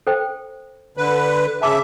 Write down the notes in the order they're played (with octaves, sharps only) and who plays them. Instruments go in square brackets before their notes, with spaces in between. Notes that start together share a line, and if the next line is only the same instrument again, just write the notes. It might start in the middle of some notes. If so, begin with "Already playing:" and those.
[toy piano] A4 C5 G5
[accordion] D3 B4
[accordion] C#3 E5 [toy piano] G#5 A5 D6